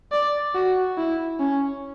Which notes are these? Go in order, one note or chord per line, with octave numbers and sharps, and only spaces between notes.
D5
F#4
E4
C#4